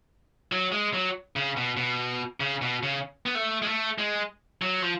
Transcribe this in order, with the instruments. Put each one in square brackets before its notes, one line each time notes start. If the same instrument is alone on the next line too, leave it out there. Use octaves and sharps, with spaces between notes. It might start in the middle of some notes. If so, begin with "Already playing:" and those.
[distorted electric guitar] F#3
G#3
F#3
C#3
B2
B2
C#3
B2
C#3
B3
A3
G#3
A3
G#3
F#3
F3